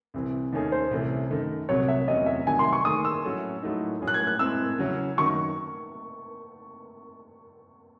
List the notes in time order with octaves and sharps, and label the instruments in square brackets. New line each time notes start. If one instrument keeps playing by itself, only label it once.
[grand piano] C2 C3 E3 C4
D#2 D#3 A3 C#4 G#4
[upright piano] C5
[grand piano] C2 C3 E3 A3 C#4
F#2 D#3 A3
[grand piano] C2 C3 F#3 [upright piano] C#5
[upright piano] E5
[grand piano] E2 C3 F#3 C#4 [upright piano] D#5
[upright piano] E5
[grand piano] C2 C3 D#3 F#3 [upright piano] G#5
[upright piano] C6
C#6
[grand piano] D#3 A3 D#4 G#4 [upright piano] D#6
[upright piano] E6
[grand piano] A2 F#3 C#4 E4 A4
A2 F#3 A3 D#4
A2 F#3 C#4 G#4
[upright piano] F#6
G#6
F#6
[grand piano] A2 G#3 C4 [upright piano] E6
[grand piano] C#3 F#3 C#4 E4
[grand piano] F#2 D#3 F#3 [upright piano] C#6